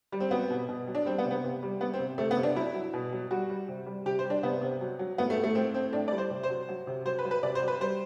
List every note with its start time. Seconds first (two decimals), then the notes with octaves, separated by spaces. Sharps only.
0.12 G3
0.20 C4
0.31 F#3 B3
0.50 B2
0.68 B2
0.87 F#3
0.95 D4
1.05 G3 C4
1.18 B3
1.25 C3
1.31 B3
1.44 C3
1.63 G3
1.81 G3 B3
1.94 C4
1.99 C3
2.18 C3 A3
2.31 B3
2.37 C3
2.43 D4
2.55 F#3 E4
2.74 F#3
2.94 B2
3.13 F#3
3.31 G3 F#4
3.49 G3
3.68 C3
3.86 G3
4.06 C3 G4
4.19 C5
4.24 G3
4.30 D4
4.43 C3 B3
4.61 C3
4.81 F#3
4.99 F#3
5.18 A2 B3
5.30 A3
5.36 A2
5.44 A3
5.55 A2 C4
5.74 A2 C4
5.93 A2 D4
6.08 G3 D5
6.18 C5
6.30 C3
6.43 C5
6.50 F#3
6.69 F#3
6.87 C3
7.05 F#3 C5
7.19 B4
7.25 F#3
7.31 B4
7.43 C3 D5
7.55 C5
7.62 F#3
7.68 B4
7.80 G3 C5